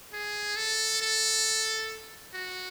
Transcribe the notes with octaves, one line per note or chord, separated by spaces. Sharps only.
G#4
A4
A4
F#4